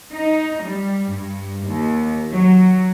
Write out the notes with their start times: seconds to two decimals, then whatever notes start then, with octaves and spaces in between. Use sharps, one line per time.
0.13 D#4
0.64 G3
1.11 G2
1.69 D#2
2.33 F#3